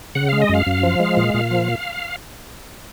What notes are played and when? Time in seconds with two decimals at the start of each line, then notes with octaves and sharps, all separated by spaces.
0.15 C#3 F#5
0.29 G#3 F5
0.41 D#5
0.49 F#2 F5
0.66 F#2
0.83 F3
1.00 G#3
1.17 A#2
1.34 A#2
1.51 F3